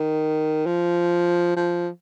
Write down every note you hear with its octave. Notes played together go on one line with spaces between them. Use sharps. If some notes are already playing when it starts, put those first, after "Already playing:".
Already playing: D#3
F3
F3